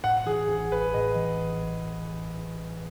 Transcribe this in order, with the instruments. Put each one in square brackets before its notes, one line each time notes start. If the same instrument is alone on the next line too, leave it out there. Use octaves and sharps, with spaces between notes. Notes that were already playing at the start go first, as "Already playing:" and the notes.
[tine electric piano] A2 [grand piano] F#5
[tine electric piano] E3 [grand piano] G#4
[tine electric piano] A1 [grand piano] G#4
[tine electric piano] A1 [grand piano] B4
[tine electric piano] A2 [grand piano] D#5
[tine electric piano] E3
A1